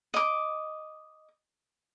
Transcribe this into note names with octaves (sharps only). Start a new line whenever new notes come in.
D#5 D6